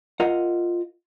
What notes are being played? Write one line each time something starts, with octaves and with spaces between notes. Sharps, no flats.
F4 A#4 D#5 F#5